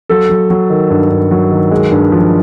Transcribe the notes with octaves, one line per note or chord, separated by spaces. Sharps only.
F#3 A4
F#3
F#3
D#3
G2
G2
F#3
D#3
G#3
G2
F3